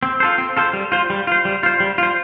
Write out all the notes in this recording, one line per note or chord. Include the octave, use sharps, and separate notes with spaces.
C4
F4 A4 C5
C4
F4 A4 C5
G3
F4 C5
G3
F4 C5
G3
F4 C5
G3
F4 C5